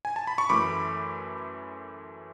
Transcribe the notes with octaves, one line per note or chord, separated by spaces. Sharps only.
G#5
A5
B5
C#6
F#2 E3 A3 B5 D6